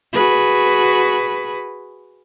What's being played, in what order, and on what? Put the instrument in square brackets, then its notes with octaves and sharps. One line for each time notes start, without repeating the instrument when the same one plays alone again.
[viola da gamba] F#4 G#4 B4